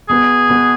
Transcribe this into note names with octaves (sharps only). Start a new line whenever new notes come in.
B2 B3 F#4 G#4
B2 B3 F#4